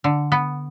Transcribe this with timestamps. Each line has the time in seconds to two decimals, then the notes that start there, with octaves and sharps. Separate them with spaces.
0.04 D3
0.32 B3